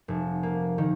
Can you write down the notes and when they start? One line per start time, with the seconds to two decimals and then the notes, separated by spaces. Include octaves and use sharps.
0.08 F1
0.43 A#3
0.78 D#3